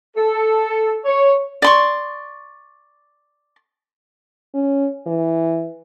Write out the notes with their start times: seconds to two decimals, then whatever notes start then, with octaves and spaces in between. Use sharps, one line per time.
0.16 A4
1.05 C#5
1.62 D5 C6 C#6
4.54 C#4
5.07 E3